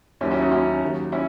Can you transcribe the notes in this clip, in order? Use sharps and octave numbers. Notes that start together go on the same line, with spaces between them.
D#2 D#3 F#3 C#4 E4
C#4 E4
D#4 F#4
C#4 E4
D#2 D#3 F#3
C#4 E4